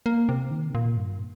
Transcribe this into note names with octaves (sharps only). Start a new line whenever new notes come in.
A#3
C3
D#3
C3
A#2
G2